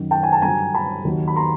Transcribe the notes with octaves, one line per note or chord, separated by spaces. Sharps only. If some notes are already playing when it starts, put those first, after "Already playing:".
Already playing: F#2 D#3 F#3
G5 A5
G#5
A5
G2 D3 F#3 G#5 A#5
A5 B5
D#2 D#3 F#3
B5
A#5 C6